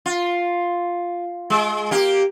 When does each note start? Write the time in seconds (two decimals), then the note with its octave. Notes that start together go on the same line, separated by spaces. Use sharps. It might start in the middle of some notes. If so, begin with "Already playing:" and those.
0.06 F4
1.50 G#3
1.91 A#3 G4